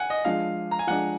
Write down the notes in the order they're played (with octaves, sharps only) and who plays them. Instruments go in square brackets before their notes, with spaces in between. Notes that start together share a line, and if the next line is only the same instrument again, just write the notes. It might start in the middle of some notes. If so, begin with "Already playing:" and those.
Already playing: [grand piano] F#5 G#5
D#5
[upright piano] F3 G#3 D4 [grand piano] F5
[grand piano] A#5
G#5
[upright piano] F3 G#3 D4 [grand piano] F#5